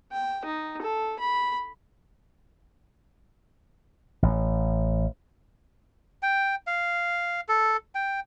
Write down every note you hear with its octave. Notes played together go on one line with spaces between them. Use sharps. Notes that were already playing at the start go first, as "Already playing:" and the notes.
G5
D#4
A4
B5
A1
G5
F5
A4
G5